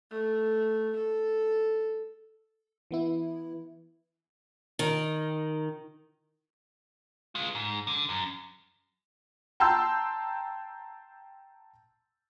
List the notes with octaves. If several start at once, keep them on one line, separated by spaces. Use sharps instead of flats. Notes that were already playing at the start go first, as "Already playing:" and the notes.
A3
A4
E3 B3 E4
D#3
G#3 F4
G#2
D3
F#2
G5 A5 A#5 C6 E6 G6